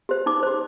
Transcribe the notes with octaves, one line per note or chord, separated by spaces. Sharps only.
G4 C5
D#4 D6
G4 C5